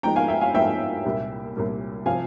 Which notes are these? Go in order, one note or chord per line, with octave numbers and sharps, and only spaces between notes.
G#2 F3 G#3 G5 A#5
F5 G#5
E5 G5
F5 G#5
G#2 F3 G#3 E5 G5
C2 A#2 G3 A#3
C2 A#2 G3 A#3
C3 F3 F5 G#5